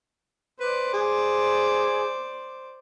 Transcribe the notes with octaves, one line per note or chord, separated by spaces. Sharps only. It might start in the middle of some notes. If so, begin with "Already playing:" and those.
B4 C5 D5
G#4